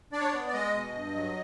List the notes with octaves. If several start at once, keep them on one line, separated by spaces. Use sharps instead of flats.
D4 D5
C#5
D5
B3
D5
G#3 D#5
B2
G2
F#3